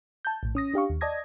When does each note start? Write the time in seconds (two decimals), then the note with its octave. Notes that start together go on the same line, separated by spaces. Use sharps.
0.25 A5 G6
0.43 A#1 A2
0.55 C#4 D#6 A#6
0.74 D4 G4 F5 C#6
0.90 D#2
1.01 D5 D#5 A5 D#6 G#6 A#6